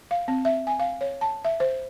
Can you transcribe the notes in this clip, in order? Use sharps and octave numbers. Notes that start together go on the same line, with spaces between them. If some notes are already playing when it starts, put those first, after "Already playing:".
F5
C4
E5
G#5
F5
C#5
A5
E5
C5